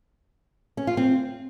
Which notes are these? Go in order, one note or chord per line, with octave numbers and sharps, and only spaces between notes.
C#4
F4
C4